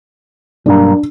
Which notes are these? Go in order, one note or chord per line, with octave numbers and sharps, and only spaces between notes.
B1 G2 A#3 D4